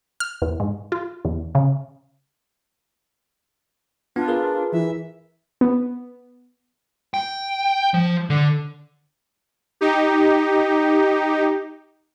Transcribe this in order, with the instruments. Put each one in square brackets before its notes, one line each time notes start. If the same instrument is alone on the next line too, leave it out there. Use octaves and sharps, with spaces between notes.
[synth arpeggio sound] F6
E2
G#2
F4
E2
C#3
[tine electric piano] B3 [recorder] D4 [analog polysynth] F4
[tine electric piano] G#4 A#4 B4
[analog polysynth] E3 [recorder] E5
[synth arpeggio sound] B3
[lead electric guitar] G5
F3
D3
[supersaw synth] D#4 G4